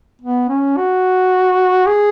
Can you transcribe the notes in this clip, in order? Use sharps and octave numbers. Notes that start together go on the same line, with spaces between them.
B3
C#4
F#4
G#4